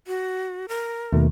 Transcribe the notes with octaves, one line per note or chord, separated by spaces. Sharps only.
F#4
A#4
D#2 B2 D#3 A3